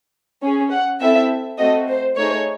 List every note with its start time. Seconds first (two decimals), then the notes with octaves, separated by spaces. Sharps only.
0.43 C#4 G#4
0.71 F#5
1.00 C4 E4 A4 E5
1.58 A3 C4 F#4 A4 D#5
1.88 C5
2.16 A3 D#4 G#4 C#5